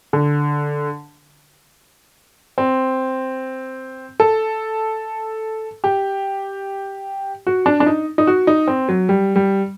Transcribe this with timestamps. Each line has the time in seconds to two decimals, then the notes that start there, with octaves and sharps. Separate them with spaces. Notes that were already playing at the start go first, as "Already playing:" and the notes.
0.13 D3
2.58 C4
4.20 A4
5.84 G4
7.47 F#4
7.66 D4
7.80 D4
7.86 D#4
8.18 D#4
8.27 F#4
8.47 D#4
8.68 C4
8.89 F#3
9.09 G3
9.36 G3